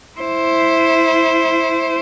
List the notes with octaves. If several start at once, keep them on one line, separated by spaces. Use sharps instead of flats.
E4 C5